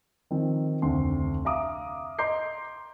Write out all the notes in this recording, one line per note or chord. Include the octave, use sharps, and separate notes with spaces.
D#3 F3 C4
F1 D2 C4 C6
E5 F5 A#5 D6 D#6
D#5 A#5 C6 D6 G6 C7